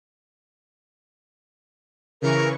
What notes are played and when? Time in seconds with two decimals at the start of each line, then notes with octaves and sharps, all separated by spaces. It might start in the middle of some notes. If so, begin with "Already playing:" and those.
2.22 C#3 E3 A#4 C#6